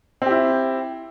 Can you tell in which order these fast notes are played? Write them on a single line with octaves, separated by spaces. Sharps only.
C4 G4 E4